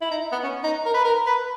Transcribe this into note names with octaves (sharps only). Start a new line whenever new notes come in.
E4
D#4
B3
C#4
D#4
A#4
B4
A#4
B4